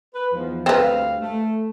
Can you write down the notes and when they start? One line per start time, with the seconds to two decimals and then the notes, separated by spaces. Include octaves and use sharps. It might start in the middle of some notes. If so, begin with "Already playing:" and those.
0.15 B4
0.32 E2 G#2 F3
0.66 D2 G2 C4 B4 F5
1.21 A3